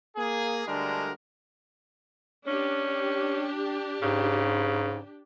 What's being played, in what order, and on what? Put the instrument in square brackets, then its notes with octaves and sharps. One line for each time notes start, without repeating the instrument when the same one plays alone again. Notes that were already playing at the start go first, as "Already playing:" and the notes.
[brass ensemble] A#3 G#4
D2 D3 G3 G#3 D4 A#4
[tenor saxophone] C#4 [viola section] D4 G4
[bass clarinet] G#2 [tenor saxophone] C#3